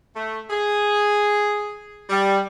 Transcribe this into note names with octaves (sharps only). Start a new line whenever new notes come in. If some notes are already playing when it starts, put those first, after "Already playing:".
A3
G#4
G3